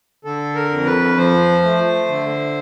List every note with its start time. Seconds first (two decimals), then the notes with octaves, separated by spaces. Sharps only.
0.24 D3 A4
0.55 A#4
0.71 F2
0.86 B4
1.17 F3 C5
1.63 A3
2.09 D3